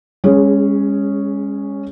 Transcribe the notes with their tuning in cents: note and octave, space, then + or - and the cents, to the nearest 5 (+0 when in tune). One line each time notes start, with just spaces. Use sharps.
G#3 -35 C#4 +0 G#4 +0